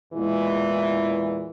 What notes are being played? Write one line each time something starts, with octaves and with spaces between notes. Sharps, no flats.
E2 A#2 E3 G#3 E4